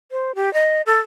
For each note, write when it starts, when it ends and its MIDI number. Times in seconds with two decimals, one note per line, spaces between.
0.11 0.35 72
0.35 0.52 67
0.54 0.82 75
0.86 0.99 69